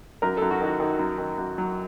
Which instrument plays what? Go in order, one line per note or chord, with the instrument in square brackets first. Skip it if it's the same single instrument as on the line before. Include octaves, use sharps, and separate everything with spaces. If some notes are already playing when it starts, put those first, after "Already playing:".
[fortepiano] F#2 A#4
F#2 A4
F#4
D#3 F#4
D#3
F#2
D#3
F#2
F#3